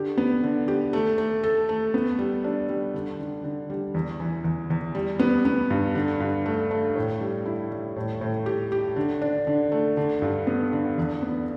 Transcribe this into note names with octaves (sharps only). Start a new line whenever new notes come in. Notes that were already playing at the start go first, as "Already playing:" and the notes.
Already playing: D3 G4
B3
D3
G4
A3
A3
A4
A3
B3
G3
D4
G3
D3
D3
D3
G3
E2
E3
E2
E2
G3
B3
B3
G2
D3
G2
A3
A3
A2
G3
E4
G3
A2
A2
G4
G4
D3
D4
D3
A3
D3
G2
B3
D3
E2
B3